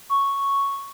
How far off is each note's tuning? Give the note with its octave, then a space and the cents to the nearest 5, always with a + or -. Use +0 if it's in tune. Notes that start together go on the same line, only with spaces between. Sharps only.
C#6 +0